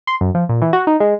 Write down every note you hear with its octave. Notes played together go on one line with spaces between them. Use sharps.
C6
F#2
F3
A#2
E3
F#4
D#4
G#3